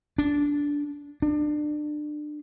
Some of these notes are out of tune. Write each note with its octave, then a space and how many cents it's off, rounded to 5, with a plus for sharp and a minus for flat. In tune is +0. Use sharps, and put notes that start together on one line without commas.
D4 -15
D4 +25